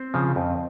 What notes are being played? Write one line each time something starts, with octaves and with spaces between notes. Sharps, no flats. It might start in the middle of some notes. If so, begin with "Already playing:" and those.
Already playing: C4 C5
C#3 F3
F2